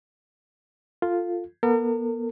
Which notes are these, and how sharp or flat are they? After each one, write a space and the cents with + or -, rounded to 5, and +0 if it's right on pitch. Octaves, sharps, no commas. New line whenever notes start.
F4 +0 A4 +20
B3 -40 A#4 -45